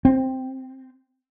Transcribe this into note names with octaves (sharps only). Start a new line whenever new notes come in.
C4